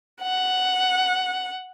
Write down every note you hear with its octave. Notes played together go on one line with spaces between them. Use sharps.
F#5